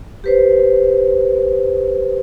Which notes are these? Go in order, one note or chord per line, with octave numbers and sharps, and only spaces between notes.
G4 B4 C5